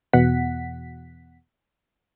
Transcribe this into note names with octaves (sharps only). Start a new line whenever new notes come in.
E2 B2 F#5 B6